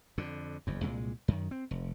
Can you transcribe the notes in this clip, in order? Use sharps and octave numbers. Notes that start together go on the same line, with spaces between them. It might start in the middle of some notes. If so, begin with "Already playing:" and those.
F2 D3
F#1 E2
C2 A#2 G#3
F#2 D#3
C4
F1